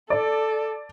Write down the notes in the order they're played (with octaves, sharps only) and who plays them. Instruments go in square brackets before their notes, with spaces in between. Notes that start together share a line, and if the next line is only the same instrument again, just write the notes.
[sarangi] A4 [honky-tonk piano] D5